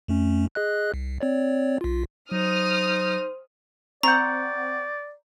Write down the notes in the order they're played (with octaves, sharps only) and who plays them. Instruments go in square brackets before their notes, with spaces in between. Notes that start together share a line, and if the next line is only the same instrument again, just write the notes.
[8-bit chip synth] F2 A3 C#4
G#4 D#5 F#6
C2
C4 C#5 D5
B1 F4
[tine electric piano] F#3 [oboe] D#4 [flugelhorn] C5 [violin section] D#6 F6
[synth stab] C4 F#5 [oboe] D5 [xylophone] A#5 [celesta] C#6 G6